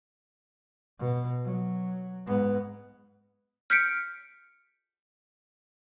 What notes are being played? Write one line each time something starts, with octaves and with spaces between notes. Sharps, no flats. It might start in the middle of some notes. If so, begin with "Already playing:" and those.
B2
F#3
G#2 B3
F6 G6 B6 C#7 D7